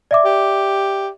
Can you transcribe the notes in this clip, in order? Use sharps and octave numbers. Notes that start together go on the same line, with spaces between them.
D5 E5 D6
G4